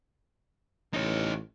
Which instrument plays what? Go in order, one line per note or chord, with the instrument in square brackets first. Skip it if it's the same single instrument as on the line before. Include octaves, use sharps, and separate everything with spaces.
[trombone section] A1 [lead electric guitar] D#4 C#5